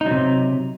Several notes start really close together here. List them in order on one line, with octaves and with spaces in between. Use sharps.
D#4 F#3 C3